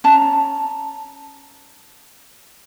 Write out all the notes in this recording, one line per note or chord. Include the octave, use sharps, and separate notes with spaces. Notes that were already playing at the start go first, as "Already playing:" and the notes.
C#4 A5 A#5